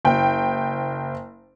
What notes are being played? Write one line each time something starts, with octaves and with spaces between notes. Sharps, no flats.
F#1 G5